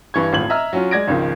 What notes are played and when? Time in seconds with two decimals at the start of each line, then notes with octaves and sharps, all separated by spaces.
0.14 G2 E3 C#6 G#6
0.32 D#1 G#1 A2 F4 G#6 F#7
0.49 D#5 E5 A#5 E6 F6
0.73 F#3 C#4 F4
0.91 G#3 D5 G#6 A#6 D7
1.08 G#1 C#2 D#3 F3